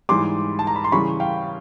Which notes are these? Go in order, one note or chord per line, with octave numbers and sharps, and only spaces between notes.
G#2 E3 G3 C6 D6
A5
A#5
B5
C6
C#3 E3 G3 B5 C#6
F5 G5